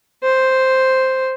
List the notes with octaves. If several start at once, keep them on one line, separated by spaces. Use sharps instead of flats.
C5